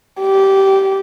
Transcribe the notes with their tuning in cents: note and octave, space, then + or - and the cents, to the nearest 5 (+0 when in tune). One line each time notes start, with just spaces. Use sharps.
G4 -15